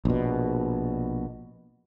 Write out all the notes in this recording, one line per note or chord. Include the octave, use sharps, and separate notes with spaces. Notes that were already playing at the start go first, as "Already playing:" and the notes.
A#1 B2